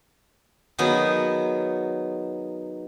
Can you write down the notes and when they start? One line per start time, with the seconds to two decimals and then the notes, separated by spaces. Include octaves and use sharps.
0.79 D#3 F#3 B3 G#4